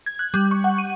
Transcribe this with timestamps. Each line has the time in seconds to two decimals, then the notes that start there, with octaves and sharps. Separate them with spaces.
0.06 G#6
0.19 F#6
0.34 G3
0.51 C#6
0.64 F#5
0.78 D#7